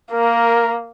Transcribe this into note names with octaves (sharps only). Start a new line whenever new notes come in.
A#3 A#4